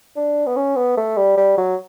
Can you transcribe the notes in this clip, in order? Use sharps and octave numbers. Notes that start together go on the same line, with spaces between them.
D4
B3
C#4
B3
A3
G3
G3
F#3